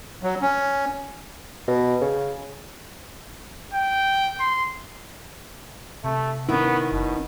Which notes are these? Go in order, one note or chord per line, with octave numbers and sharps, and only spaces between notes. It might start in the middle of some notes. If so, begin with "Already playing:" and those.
F#3
C#4
B2
C#3
G5
C6
C3 A3
D#3 B3 C#4 E4
F#1 B2